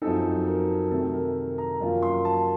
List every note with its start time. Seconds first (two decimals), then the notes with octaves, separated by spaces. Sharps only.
0.02 F#2 F3 C4 D#4 A4
0.47 A#4
0.91 C3 D#3 A3 A4
1.14 A#4
1.58 A#5
1.80 F#2 F3 A#3 C#4 F4
2.02 C6
2.25 A5